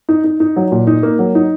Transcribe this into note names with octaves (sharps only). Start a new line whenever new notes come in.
D#4
D#4
D#4
F#3
A#2
D#4
A#3
F#3
D#4